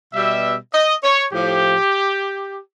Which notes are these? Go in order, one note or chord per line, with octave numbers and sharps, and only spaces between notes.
B2 G3 E5
D#5
C#5
A2 F3 G4